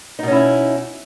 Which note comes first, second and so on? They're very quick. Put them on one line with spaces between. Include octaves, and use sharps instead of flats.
D#4 B2 C#4 E4